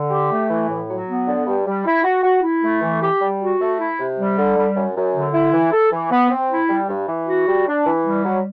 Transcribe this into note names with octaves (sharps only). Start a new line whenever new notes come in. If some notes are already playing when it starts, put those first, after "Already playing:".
Already playing: D3
G4
A3
E3
A2
F#3
B3
D3
G2
G3
E4
F#4
F#4
E4
A3
E3
G4
G3
F#4
A3
E4
C3
G3
D3
G3
F#2
F#2
D3
E4
E3
A4
E3
B3
C4
E4
G3
G2
E3
F#4
G3
D4
E3
G3
F#3